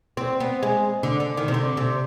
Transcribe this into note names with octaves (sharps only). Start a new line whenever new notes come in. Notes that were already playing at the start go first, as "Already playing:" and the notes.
C4
B3
G#3
D3
D3
D#3
C3
D3
C3